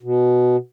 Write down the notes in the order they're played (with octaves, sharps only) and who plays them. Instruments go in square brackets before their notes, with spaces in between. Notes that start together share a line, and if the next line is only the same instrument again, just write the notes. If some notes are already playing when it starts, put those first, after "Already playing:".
[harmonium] B2